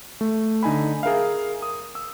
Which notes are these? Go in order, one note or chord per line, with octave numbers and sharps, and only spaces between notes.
A3
D3 D#4 G#5 B5
G#4 A#4 E5 F5
D#6
E6